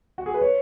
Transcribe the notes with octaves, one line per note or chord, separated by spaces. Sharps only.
F#4
G#4
B4
C#5